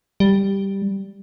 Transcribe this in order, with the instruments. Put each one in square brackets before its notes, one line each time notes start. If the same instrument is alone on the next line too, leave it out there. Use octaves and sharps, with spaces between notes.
[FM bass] G3